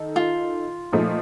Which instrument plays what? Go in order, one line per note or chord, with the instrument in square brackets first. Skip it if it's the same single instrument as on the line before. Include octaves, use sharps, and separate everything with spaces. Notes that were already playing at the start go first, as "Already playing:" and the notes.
Already playing: [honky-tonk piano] D#3 D#4 A4
[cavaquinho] F4
[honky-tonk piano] A#2 F3 A3 D#4